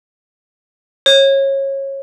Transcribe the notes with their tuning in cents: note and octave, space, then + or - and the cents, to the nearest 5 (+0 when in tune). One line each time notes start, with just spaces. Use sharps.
C#5 -25